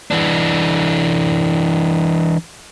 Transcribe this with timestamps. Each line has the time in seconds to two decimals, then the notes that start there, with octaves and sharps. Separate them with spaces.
0.11 E3 D4